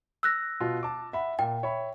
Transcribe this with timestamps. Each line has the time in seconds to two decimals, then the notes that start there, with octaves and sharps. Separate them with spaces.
0.23 E6 F#6 A#6
0.60 B2 F4
0.83 A5 D6
1.13 E5 F#5 B5
1.39 A#2 G5
1.63 C#5 E5 B5